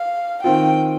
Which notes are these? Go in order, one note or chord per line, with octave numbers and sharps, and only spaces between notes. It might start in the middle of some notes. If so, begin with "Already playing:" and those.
Already playing: F5
D#3 C4 F4 G5